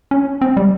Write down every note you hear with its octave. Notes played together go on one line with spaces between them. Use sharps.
C#4
C4
G3